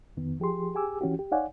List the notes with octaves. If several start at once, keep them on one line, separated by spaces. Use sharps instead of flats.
F2 D#3 B3
F3 G4 G#4 C6
G4 G#4 G#5 D6 E6
E3 C#4 F#4 G4
G4
D#4 C#5 D5 F5 F#5 G#5